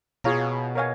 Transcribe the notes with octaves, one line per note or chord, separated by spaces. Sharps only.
B2 F4 G#4 C#5 F5 A#5
A#4 C#5 F5 G#5